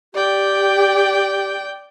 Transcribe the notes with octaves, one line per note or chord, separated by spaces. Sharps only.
G4 D5 G5